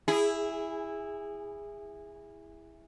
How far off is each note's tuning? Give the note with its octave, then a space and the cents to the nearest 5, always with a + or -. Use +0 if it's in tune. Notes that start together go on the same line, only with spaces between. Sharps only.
E4 +0 G#4 -20